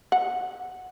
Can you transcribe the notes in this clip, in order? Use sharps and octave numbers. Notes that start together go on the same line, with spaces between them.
F#5